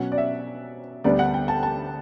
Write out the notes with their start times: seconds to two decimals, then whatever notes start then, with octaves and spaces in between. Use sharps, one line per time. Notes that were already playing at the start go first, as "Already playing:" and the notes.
Already playing: B2 F#3 C#4 F#5
0.12 D5
0.18 E5
1.04 D2 D3 G3 B3 D5
1.19 F#5
1.34 G5
1.48 A5
1.63 A5